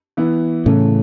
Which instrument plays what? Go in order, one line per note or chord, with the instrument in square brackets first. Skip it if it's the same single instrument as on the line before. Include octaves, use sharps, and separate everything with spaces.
[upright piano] E3 B3 E4
[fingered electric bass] A2 C#3 [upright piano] E3 A3 C#4